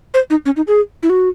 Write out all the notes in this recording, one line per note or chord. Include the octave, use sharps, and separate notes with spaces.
C5
D#4
C#4
D#4
G#4
E4
F#4